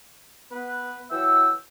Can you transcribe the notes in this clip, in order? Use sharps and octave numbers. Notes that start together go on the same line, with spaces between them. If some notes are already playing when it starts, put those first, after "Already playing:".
B3 B4
E3 F#3 E5 F#5 G5 E6